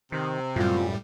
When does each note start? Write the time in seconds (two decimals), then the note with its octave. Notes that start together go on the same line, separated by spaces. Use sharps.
0.12 C3 D#3
0.56 F#2 A2 G3 F4